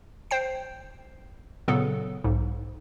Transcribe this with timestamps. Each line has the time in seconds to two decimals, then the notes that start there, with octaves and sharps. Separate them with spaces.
0.31 C5 G5 C7
1.68 A#2 C#3 F#3 B3 A4
2.24 B1 G#2